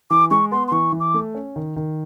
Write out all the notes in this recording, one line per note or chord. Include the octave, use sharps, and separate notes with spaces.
E3 D6
G#3 C#6
B3 C6
C6
E3 C#6
E3
D6
A3
C#4
D#3
D#3